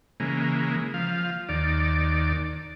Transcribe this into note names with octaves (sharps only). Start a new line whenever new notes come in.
C#3 E3 G#3 A#3
F3 F5
D#2 D5